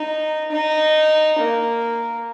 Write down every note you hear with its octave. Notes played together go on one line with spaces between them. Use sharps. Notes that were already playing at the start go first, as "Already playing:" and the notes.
Already playing: D#4
D#4
A#3